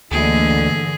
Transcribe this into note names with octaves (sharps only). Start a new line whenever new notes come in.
D2 G2 D3 E3 A3 A#3 G#4 D#5